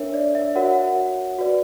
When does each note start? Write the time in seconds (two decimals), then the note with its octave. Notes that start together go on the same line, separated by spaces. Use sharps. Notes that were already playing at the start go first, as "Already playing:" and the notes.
Already playing: D4 A#4 C#5 E5
0.14 D5
0.35 E5
0.55 F#4 A#4 C#5 F#5
0.64 E5
0.73 F#5
1.39 F#4 B4 D5